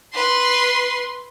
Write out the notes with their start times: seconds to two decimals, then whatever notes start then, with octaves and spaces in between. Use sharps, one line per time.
0.14 B4 C6